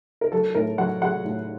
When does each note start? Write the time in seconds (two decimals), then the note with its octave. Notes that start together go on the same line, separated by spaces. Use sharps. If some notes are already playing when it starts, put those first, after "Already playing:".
0.21 A#4
0.32 F#3 A4
0.55 A2 A#4
0.78 F#3 F#5
1.01 F#3 F#5
1.24 A2